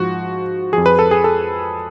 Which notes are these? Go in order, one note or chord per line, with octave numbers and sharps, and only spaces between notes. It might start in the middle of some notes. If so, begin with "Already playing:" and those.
Already playing: G#2 F3 F#4
F2 F3 G#4
B4
A4
G#4
A4